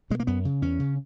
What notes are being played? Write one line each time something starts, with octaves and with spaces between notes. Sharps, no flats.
B2 G#3
A#3
F#2 B3
C#3
E2 C#4
C#3